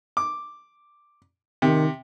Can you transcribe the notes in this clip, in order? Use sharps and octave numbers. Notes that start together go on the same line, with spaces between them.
D6
C3 D#3